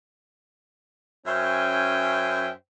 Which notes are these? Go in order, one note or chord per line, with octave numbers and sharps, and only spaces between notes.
F#2 C#4 C5 E5 G5 G#5